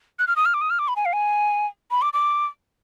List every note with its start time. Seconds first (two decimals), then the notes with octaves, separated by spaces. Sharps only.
0.19 F#6
0.28 F6
0.36 D#6
0.45 F6
0.54 D6
0.61 D#6
0.70 F6
0.79 D6
0.88 B5
0.96 G#5
1.05 F5
1.13 G#5
1.91 B5
2.02 D6
2.13 D6